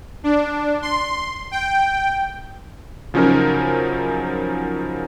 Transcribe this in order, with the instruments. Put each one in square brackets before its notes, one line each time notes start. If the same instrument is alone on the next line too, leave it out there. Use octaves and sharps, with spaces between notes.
[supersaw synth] D4
C6
G5
[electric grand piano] C#3 F3 F#3 C#4 D#4 A#4